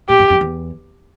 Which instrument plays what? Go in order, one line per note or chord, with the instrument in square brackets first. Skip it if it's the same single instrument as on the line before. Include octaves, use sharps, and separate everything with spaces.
[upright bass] A#2 [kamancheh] G4
[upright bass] G2
F2
E2